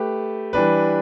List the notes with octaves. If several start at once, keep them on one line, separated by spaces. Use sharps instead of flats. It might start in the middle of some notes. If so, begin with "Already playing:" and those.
Already playing: A3 G4 B4
E3 G3 D4 B4